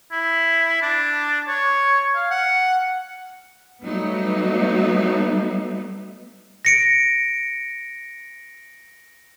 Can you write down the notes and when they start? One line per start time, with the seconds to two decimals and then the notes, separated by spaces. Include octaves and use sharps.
0.12 E4
0.82 D4
1.48 C#5
2.15 F5
2.31 F#5
3.83 F#3 G3 A3 B3 D#4
6.65 A#6 C#7 D7